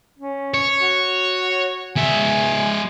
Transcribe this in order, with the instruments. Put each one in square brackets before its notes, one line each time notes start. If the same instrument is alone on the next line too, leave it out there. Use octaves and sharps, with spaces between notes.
[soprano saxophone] C#4
[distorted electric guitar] C#5
[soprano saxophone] F#4
[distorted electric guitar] G#3 E5 [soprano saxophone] G#5